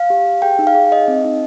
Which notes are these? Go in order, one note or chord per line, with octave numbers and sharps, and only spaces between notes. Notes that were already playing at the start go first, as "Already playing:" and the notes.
Already playing: F5
G4
G4
G#4 G5
D#4
F5
G#4
D#4 D#5
C4
D#4